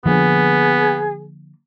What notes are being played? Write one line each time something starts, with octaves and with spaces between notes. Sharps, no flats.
D3 F3 A#3 B3 G#4